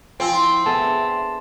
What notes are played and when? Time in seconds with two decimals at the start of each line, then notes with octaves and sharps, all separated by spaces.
0.20 F3 C4 G#5
0.33 E4 C6
0.66 B3 G#4 A4 E5 A5
0.84 D4